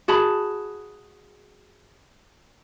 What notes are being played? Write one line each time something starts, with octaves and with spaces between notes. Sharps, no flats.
F#4 G#4 A5 B5